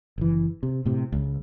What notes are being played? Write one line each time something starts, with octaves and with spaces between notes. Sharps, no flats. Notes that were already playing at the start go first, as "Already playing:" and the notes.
F#1 E3
C3
A2 C3
C#2